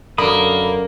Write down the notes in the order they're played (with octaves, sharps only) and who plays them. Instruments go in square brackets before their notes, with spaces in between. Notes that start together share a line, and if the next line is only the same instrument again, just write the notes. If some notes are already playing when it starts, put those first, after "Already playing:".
[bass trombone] F#2 [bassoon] D3 [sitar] A#3 [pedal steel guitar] B5 D#6